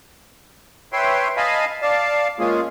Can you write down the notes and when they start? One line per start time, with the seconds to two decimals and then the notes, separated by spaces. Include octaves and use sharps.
0.93 B4 C#5 E5 G5 C6
1.37 D#5 F5 G#5 A5 B5
1.82 D5 F5 A5
2.39 G#3 A#3 C#4 F4 G#4